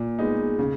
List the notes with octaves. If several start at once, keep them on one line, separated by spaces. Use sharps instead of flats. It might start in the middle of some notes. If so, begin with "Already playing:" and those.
Already playing: A#2
G#3 B3 D#4
C#3